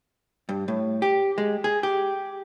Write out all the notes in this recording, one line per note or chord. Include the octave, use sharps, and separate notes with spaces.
G2
A2
G4
G#3
G#4
G4